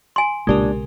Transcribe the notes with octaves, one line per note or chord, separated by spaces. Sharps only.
G#5 C6
B1 A#2 C#3 G#3 D4 G4 A#4